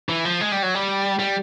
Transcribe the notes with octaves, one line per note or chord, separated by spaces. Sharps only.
E3
F3
G#3
G3
F#3
G3
G3